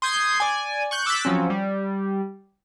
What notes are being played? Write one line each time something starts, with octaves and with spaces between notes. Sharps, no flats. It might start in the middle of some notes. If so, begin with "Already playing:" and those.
C6 D#6 G6 G#6 C7
D5 G#5
C#6 F#6 G6
D6 E6 F#6 G6 A6 B6
F3 F#3 C4 C#4
G3